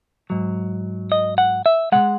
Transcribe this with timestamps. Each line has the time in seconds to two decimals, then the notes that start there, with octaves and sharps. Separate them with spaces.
0.30 G#2 F#3
1.12 D#5
1.38 F#5
1.66 E5
1.92 B2 G#3 F#5